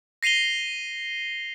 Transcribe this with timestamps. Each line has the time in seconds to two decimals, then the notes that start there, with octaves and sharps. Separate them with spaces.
0.23 A#6 C7 D#7 F7 G7